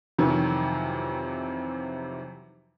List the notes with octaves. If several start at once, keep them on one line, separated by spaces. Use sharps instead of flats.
F2 C3 D#3 E3 F#3